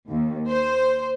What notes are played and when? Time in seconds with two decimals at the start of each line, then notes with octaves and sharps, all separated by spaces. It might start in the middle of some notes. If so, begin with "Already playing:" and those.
0.11 D#2
0.50 C5